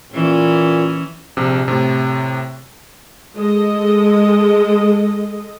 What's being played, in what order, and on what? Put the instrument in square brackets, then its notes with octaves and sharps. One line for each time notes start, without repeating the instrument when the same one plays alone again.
[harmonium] A#2 [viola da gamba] E3 C#4
[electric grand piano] A#1 C3
A2 C3
[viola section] G#3 A4 D#5